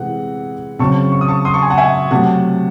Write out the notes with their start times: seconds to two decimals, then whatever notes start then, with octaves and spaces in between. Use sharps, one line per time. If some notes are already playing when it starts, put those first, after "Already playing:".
Already playing: C3 E3 G#3 C4 F#5
0.79 C#3 F#3 C4 A5 C#6
1.12 C#6
1.21 D#6
1.28 A5 C#6
1.45 C6 D#6
1.54 A5 C#6
1.62 G#5 C6
1.70 F#5 A5
1.78 E5 G#5
2.11 C3 F#3 A3 F#5 A5